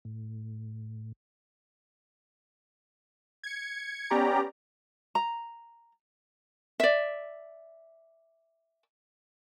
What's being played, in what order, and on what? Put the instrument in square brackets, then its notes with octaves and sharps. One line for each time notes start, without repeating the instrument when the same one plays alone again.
[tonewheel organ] A2
[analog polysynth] G#6 C#7
B3 C#4 G4 D5 A#5
[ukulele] A#5
D5 E5